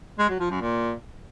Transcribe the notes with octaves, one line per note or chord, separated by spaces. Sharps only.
G#3
F#3
F3
F#2
A#2